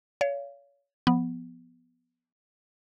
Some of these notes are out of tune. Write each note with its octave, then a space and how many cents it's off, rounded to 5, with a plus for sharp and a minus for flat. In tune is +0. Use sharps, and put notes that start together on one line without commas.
C#5 +30 F5 -20
F3 +0 B3 +0